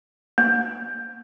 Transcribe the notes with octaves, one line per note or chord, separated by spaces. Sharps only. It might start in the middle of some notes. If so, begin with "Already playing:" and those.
A#3